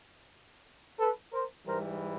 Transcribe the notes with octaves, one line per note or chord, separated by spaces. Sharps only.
A4 B4
A#4 C5
G#2 E3 G3 A#4 C5